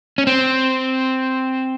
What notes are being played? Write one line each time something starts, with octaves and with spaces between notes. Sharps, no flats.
C#4
C4